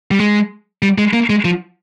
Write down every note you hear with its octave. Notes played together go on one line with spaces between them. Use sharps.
G3
G#3
G3
G#3
A#3
G#3
F3